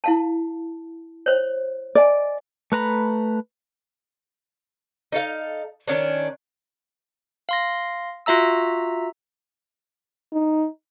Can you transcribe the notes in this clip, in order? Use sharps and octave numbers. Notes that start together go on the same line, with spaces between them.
E4 F5 A5
C5 C#5
D5 D#5 G#5
A3 B4 A#5 B5
D#4 A4 F5
D#3 C#4 D4
F5 C6 A#6
F4 F#4 E5 A#5 E6
D#4